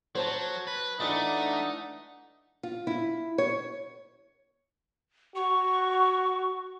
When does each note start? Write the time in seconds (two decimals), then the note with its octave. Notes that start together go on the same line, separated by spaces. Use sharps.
0.15 F#3 C5 C#5 A5
0.67 B4
1.00 E3 A3 D4 D#4 F#5
2.63 F4
2.87 E4
3.38 C#5
5.36 F#4 C#6